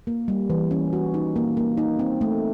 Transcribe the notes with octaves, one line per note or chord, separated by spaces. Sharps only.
A#3
G3
E3
C#4
F#4
D#4
A#3
A#3
D#4
C4
A3